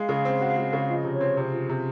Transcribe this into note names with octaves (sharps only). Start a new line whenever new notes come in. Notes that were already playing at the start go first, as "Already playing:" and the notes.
Already playing: G#3 F5
C#3
C4
F#4
G#3
C#3
F3 D#5
C3
C#5
C4
C3
F3
C3